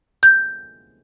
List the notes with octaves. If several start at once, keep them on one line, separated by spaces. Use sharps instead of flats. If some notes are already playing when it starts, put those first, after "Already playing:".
G6